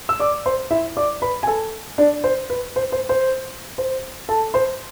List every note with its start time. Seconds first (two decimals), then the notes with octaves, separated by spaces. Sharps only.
0.09 E6
0.20 D5 D6
0.46 C5 C6
0.71 E4 E5
0.97 D5 D6
1.22 B4 B5
1.43 G#5
1.47 A4 A5
1.98 D4 D5
2.24 C5
2.50 B4
2.76 C5
2.92 C5
3.09 C5
3.78 C5
4.29 A4 A5
4.54 C5 C6